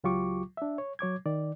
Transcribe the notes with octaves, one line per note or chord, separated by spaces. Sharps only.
C#2 F#3 F4 G4 C#6 D6
D4 E5
C#5
F#3 C#5 D6 G#6
D#3 D5